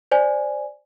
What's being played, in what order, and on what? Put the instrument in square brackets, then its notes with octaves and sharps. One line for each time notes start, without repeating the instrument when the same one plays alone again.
[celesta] C5 D5 G#5